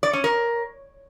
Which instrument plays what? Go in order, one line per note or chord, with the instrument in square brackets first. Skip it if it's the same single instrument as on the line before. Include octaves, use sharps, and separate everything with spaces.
[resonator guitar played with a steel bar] D5
C#4
A#4